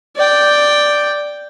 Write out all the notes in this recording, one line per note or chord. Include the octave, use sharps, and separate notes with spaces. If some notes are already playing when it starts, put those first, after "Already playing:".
D5 G5